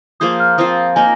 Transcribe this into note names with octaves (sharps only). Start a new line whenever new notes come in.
F3 A#3 G#4 C5 D#6
F6
F3 C4 F4 C5 D#6
A#3 D#4 A#4 D#5 G#5